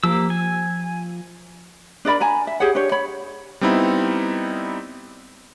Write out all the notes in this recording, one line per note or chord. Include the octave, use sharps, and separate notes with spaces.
F3 A#3 G4 E6
G#5
D4 A#4 D5 B5
G#5 A#5 B5
E5
G4 G#4 C#5 F#5
D4 G4 C#5
C#5 B5
G3 B3 C4 D#4 E4